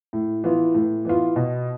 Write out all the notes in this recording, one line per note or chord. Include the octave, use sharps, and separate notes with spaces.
A2
E3 B3 F4
A2
E3 B3 F4
B2